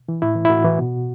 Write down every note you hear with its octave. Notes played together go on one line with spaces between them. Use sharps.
E3
A2 E4
E3
E4
A2 F#4
E3
B2